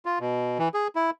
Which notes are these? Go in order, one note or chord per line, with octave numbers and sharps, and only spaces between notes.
F4
B2
E3
G#4
E4